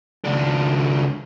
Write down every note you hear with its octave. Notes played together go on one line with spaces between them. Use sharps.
C#2 D4